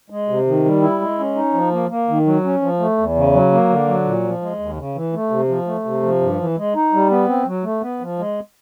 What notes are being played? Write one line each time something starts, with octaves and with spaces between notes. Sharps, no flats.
G#3
C3
D#3
G3
E4
G#3
C#4
D#4
F3
A#3
A#3
D#3
F#3
C#4
F3
A3
E2
C#3
F#3
A#3
D3
F#3
A#2
F3
G#3
D#2
C#3
E3
A3
C3
F3
A3
C3
F3
G2
E3
G#3
D#4
G3
B3
C4
F#3
A3
B3
F3
G#3